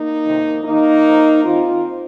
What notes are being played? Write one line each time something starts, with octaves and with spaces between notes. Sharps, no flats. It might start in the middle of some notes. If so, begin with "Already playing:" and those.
Already playing: A#3 D#4
F2 C3 D#3
D#2 D#3 A#3 D#4
F2 F3
D#2 D#3 C4 F4